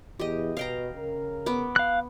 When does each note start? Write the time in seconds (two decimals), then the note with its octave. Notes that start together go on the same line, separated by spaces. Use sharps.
0.19 E2 G4 D#5
0.57 B2 F5 G5 A#5
0.95 C#3 A#4
1.46 B3 D6
1.76 F5 F#6